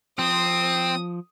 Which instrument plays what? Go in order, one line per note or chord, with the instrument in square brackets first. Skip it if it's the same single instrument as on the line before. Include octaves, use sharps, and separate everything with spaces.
[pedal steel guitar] F3 [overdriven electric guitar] C4 [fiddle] D#6